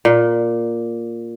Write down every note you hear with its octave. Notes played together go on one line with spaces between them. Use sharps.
A#2